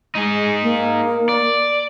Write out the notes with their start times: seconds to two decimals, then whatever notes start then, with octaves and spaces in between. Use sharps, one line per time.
0.15 G#3 D#4 G#4
0.63 A#3
1.29 D5